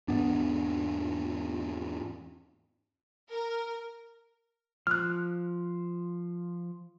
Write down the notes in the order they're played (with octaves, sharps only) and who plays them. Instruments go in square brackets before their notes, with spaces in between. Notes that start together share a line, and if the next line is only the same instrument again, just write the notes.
[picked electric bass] E2 G#2 B3 D4
[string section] A#4
[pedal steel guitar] F3 [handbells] F6 F#6